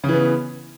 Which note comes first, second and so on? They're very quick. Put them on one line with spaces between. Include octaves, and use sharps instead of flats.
C#3 E3 B3